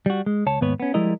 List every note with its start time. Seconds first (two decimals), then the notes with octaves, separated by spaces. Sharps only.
0.06 G3 F#4
0.26 G#3
0.46 C#2 C#5 A5
0.61 D#2 G#2 B3 B4 C#5
0.80 B3 C#4
0.94 F3 G3 G#3 E4 A#4 D#5